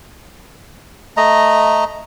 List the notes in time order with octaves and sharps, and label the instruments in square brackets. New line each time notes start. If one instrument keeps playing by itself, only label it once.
[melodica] A3 D#5 A#5